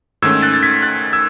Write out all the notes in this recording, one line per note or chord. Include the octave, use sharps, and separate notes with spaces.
G#2 D#3 A3 C#4 E6 G#6
F#6 A6
A6
G#6 B6
F#6 A6
E6 G#6